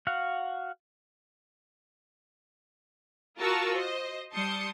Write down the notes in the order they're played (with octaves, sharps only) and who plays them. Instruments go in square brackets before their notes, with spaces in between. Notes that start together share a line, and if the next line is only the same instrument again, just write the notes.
[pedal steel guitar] F#4 F5 F#5
[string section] F4 F#4 A#4 A5 C#6 E6
C5 D#5
G3 A5 C6 D#6 G6 C#7